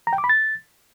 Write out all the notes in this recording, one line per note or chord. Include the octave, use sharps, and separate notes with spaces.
A#5
G5
D6
B5
A6